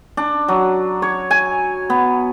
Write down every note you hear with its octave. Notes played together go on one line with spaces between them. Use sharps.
D4
F#3
C#5
G#5
B3